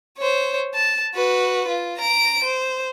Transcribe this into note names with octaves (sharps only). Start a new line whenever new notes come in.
C5 C#5
A5
F#4 B4
F4
A#5 D7
C5